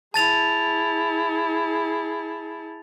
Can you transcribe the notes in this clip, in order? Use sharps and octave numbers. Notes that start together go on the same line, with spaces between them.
E4 G#4 A5 A6 F7